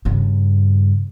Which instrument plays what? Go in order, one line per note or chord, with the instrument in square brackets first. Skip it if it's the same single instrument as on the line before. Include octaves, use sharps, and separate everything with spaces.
[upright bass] G2 C#3